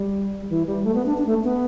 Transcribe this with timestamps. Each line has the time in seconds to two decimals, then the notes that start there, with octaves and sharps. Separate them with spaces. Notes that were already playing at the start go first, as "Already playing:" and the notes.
Already playing: G3
0.49 E3
0.67 G3
0.84 A3
0.95 B3
1.06 D4
1.18 D4
1.26 A3
1.44 B3